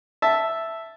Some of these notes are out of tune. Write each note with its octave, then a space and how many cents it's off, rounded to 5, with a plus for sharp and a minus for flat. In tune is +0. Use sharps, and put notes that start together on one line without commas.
E5 +0 A5 +0